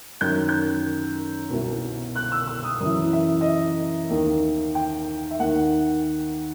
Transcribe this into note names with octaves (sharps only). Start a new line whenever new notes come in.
F#2 D#3 G6
G6
C2 B2
F#6
E6
E6
D#6
F#2 E3 D#6
E5
D#5
E5
D#2 D#3
G5
E5
D#2 D#3 F#5